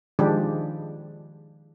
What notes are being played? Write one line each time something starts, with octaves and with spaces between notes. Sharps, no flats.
D#3 F3 G#3 D4 G4